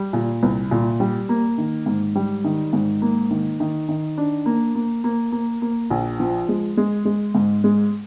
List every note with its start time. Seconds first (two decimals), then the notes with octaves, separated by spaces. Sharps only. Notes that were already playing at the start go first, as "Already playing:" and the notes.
Already playing: G3
0.13 A#2
0.43 C2
0.71 A#2
1.00 G3
1.29 A#3
1.58 D#3
1.86 G#2
2.15 G3
2.44 D#3
2.73 G#2
3.02 A#3
3.31 D#3
3.60 D#3
3.89 D#3
4.18 D4
4.46 A#3
4.75 A#3
5.04 A#3
5.32 A#3
5.62 A#3
5.90 A#1
6.20 F3
6.49 G#3
6.77 G#3
7.05 G#3
7.35 G#2
7.64 G#3